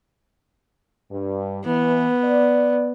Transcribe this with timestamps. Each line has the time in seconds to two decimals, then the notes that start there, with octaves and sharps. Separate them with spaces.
1.11 G2
1.65 E3 B3
2.25 D5